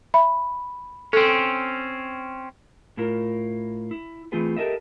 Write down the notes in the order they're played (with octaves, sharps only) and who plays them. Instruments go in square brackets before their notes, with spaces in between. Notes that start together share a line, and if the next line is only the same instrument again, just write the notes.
[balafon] E5 [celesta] B5
[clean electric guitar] C4 C#4 [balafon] A4
[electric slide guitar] A2 E4 F4 A#4
E4
E3 A3 C4 F4 G#4 B4
G4 A4 A#4 D#5 E5